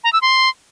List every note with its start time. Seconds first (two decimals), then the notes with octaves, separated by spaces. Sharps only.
0.04 A#5
0.13 E6
0.22 C6